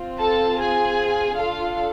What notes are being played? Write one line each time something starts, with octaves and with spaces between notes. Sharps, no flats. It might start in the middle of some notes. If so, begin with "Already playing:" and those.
Already playing: C4 F4
A4 A5
G#4 G#5
D4 F4 A4 F5